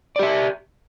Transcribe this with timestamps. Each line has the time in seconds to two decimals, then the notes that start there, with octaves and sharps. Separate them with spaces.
0.16 D5
0.19 G4
0.23 E5